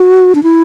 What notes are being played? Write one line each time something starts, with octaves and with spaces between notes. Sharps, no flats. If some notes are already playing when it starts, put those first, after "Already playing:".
Already playing: F#4
D4
E4